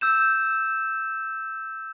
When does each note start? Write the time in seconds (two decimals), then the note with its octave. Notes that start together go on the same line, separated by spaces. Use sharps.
0.01 E6 G6 E7